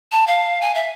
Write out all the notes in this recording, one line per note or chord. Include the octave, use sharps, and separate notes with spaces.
A5
F5
G#5
E5